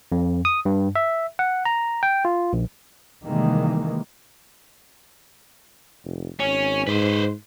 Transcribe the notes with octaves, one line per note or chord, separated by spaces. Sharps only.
F2
D#6
G2
E5
F#5
A#5
G5
F4
A#1
C3 D#3 E3 G3 G#3 A#3
F1
G#1 C#4
G#2 B4 C5